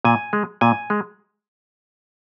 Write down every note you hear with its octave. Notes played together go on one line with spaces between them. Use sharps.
A#2 G#5
G#3
A#2 G#5
G#3